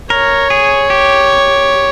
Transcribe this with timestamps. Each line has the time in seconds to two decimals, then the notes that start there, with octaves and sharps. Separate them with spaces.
0.10 A#4 C#5
0.50 G#4
0.90 G4